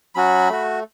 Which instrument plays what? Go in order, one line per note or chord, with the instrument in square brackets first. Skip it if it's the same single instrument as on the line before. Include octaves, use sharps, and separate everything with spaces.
[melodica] F#3 C#4 F#4 B5
A3 F#4